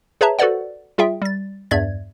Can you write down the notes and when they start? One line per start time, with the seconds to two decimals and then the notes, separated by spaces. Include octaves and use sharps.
0.21 G#4 B4 C#5 E5 A5 A#5
0.39 F#4 A4 B4 C5 D5 F#5
0.98 G3 F4 G#4 E5 G5
1.22 G3 A6
1.71 E2 G2 D5 E5 G#6